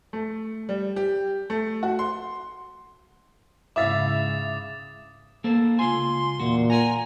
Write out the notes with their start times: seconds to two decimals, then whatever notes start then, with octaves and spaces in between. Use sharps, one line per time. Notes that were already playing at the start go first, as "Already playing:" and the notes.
0.13 A3
0.69 G3
0.96 G4
1.50 A3
1.83 F#4
1.99 C6
3.76 G#2 C#3 E4 E5 F5 D6 D#6 A6
5.44 A#3 A4 C5
5.79 C#2 F4 G#5 C6
6.40 E2 A#2 F#4
6.70 A#4 F#5 G#5 A#5